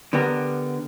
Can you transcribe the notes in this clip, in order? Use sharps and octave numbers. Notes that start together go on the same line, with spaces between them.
D3 B3 G4 A#4